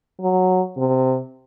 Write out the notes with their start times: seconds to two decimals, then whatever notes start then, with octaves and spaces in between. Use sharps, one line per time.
0.21 F#3
0.78 C3